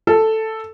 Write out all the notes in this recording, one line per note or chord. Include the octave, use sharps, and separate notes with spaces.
A4